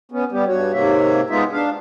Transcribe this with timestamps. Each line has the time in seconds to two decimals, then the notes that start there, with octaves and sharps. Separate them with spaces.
0.12 B3 C#4
0.32 G3 B3 G4
0.47 G2 F#4 C#5
0.73 G#2 C3 A#3 C#5 E5
1.30 G#3 B3 D#4 F4 E5
1.53 D4 F5